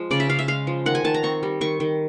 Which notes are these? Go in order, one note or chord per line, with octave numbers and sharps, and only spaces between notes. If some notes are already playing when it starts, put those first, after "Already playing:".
Already playing: F3 G#3
C#3 D5
E5
C#3 F5
E5
G#3 F5
F3
D#3 F#5
G#5
D#3 A5
A#5
C4 C#6
G3
D#3 C#6
D#3